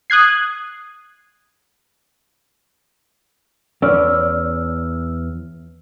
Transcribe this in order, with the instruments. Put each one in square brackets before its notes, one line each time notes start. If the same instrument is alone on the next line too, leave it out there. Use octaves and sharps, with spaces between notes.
[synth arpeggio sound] D#6 F#6 G#6 C7
[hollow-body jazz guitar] E2 C#4 D5 [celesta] E6 F6